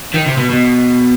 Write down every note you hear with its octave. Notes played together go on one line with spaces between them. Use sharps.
D#3
C3
B2
B2